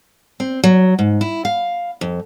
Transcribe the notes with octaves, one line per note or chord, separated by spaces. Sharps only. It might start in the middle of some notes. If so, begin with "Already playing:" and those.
C4
F#3
G#2
E4
F5
F2